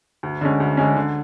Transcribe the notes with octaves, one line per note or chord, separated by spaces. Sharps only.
D2
D3 G#3 C#4
D2
D3 G#3 C#4
D3